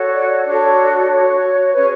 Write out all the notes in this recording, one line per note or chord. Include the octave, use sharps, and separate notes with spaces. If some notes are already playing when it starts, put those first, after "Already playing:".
Already playing: F#4 A4 C#5
D5
D4 F#4 A4 C#5
F#4 C#5
C#4 G#4 B4 C#5